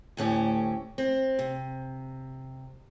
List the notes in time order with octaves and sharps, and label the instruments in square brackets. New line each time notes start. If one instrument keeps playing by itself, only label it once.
[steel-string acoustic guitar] D2 A2 C#4 G4
C4
C3